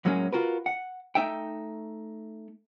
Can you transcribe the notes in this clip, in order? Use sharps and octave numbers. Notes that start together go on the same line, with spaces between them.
A2 F#3 G#3 A#3 C#4
F4 F#4 A#4 B4
F#5
A3 D#4 E5 G5